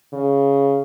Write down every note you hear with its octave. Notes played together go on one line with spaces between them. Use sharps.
C#3